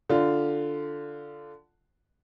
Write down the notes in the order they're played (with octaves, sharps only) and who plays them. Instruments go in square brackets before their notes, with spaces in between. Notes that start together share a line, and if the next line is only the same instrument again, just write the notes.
[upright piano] D3 F4